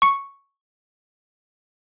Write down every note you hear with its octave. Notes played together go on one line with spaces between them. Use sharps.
C#6 C#7